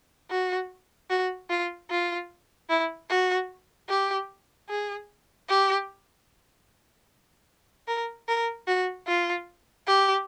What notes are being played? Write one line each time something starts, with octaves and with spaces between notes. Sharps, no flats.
F#4
F#4
F4
F4
E4
F#4
G4
G#4
G4
A#4
A#4
F#4
F4
G4